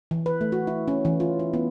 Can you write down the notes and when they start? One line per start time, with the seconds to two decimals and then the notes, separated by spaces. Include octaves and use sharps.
0.11 E3
0.26 B4
0.41 A3
0.52 F#4
0.67 E4
0.88 C#4
1.05 E3
1.20 F4
1.39 E4
1.54 B3